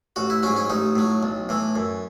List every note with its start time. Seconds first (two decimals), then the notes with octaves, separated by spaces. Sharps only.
0.16 A1 F#4
0.30 E4
0.43 G#2 F#3 C#4
0.56 C#4
0.70 A1 D#4
0.95 A2 F#3
1.23 B1
1.49 A2 E3
1.76 F#2